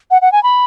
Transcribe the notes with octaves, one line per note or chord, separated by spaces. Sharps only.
F#5
F#5
G#5
B5